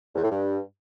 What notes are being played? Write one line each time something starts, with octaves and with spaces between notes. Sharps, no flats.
E2
A2
G2